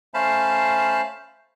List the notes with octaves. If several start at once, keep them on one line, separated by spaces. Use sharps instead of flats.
A3 C#4 C5 F5 A5 B5